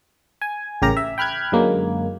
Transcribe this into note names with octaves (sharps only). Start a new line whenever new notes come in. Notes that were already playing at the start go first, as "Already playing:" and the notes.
G#5
A1 C#3 G4 A#4 A#5
E5
G5 B5 F6 F#6 G#6
F#2 D3 F#3 G#3 A#3